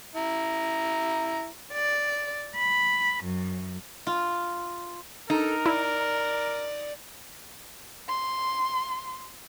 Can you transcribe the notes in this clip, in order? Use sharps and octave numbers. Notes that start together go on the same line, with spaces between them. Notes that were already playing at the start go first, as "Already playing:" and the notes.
E4 A#5
D5
B5
F#2
F4
D#4 A4 A#4
E4 D5
C6